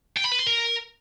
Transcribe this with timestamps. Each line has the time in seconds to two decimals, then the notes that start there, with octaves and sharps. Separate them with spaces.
0.17 G5
0.25 B5
0.32 B4
0.39 C6
0.47 A#4